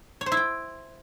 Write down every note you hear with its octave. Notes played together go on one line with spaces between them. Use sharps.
C#5
C5
E4
G5